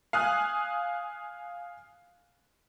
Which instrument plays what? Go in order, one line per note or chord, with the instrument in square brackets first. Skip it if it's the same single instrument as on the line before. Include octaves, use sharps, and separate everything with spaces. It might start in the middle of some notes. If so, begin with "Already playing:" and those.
[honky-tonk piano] F5 G#5 D#6 F#6